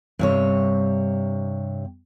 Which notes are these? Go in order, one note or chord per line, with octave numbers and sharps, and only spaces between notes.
G2 C3 C#5